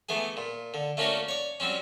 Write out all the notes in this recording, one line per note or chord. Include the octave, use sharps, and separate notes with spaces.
E3 A3 B3 G#4
A#2
D3
A3 A#3 C#4 D4 F#4 A#4
C#5 D5
F#3 G3 C4 C#4